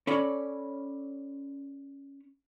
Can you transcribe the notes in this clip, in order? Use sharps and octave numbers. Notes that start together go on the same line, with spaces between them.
C#4 A4 C#5 D5 B5